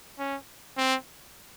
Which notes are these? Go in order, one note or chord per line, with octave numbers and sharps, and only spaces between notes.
C#4
C4